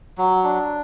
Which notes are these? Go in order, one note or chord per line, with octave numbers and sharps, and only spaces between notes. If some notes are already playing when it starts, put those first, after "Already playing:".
F#3
D4